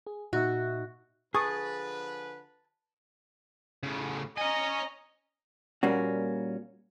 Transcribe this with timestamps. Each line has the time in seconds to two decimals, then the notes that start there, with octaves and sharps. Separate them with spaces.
0.07 G#4
0.33 A#2 D#4 F#4 E5
1.34 D3 F3 G#4 B4 A5 C#6 D#6
3.83 A2 C#3
4.38 C#5 D#5 G#5 A#5
5.83 A#2 G3 A#3 C#4 F#4